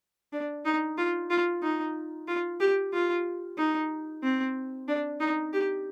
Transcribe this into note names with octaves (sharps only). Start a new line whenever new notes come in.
D4
D#4
F4
F4
D#4
F4
G4
F4
D#4
C4
D4
D#4
G4